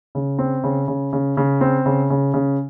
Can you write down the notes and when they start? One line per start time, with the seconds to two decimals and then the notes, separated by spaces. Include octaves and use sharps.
0.15 C#3
0.39 C4
0.64 C#3
0.88 C#3
1.13 C#3
1.37 C#3
1.61 C4
1.86 C#3
2.10 C#3
2.34 C#3